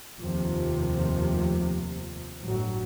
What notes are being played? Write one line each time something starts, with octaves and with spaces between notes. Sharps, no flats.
F1 D#2 C3 F3
G1 A2 F#3